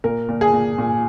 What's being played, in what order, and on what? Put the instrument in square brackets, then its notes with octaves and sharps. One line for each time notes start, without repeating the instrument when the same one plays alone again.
[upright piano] A#2 A#4
A#2
G#4
A#2
A#2